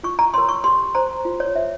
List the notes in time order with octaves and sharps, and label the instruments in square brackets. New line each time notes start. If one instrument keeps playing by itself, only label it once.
[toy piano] F4 C#6
A#5
A#4 C#5 C6
C#6
G4 C6
C5 A#5
F4
C#5
C5 E5